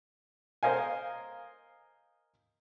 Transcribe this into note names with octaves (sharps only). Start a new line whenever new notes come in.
A#4 C5 D#5 F5 G#5